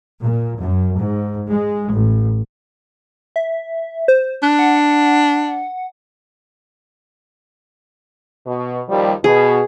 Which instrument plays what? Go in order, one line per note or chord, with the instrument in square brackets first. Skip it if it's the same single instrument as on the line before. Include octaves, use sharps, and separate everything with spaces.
[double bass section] A#2
F#2
G#2
G#3
A1
[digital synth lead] E5
C5
[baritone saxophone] D4 [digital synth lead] F#6
[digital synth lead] F#5
[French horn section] B2
D#2 F3 G3
[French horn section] B2 [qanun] G#4